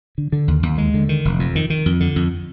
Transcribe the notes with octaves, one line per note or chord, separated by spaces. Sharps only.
D3
D3
D#2
D#2
G#3
D3
D#3
F1
F2
D#3
D#3
F2
D3
F2